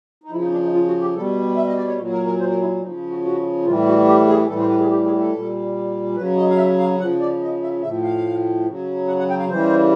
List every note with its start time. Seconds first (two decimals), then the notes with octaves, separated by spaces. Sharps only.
0.24 D#4
0.31 C#3 F3 E4
0.41 D#4
0.52 D4
0.62 D#4
0.73 F4
0.87 F#4
1.01 G4
1.15 B2 G3 A4
1.56 E5
1.68 D#5
1.77 D5
1.88 C#5
1.98 A#2 F#3
2.13 A#4
2.26 A#4
2.40 C5
2.50 A#4
2.61 E4
2.82 C#3 F3 D#4
3.10 F#4
3.23 F#4
3.65 A2 E3 G3 F4
3.87 F#4
4.07 G4
4.28 G#4
4.49 A2 E3 G3 A4
4.60 C5
4.70 B4
4.80 G#4
4.90 G4
5.05 G#4
5.18 A4
5.32 A#2 G3
6.16 C#3 F#3 B4
6.37 D#5
6.50 F5
6.57 E5
6.79 F5
7.00 C#3 F3 F#5
7.21 D5
7.41 D#5
7.62 E5
7.83 A2 F3 E5
8.03 F5
8.67 C#3 F#3
9.08 F#5
9.19 F#5
9.30 G5
9.40 F5
9.50 C#3 E3 G3 C5